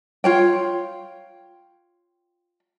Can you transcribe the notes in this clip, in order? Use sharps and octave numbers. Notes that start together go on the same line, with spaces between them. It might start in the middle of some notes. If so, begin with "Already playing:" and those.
F4 C#5 G5